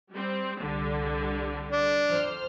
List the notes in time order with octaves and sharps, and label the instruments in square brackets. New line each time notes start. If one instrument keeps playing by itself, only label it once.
[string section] G3 C4
C2 D3 G3
[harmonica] D4
[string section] F2 C5 F6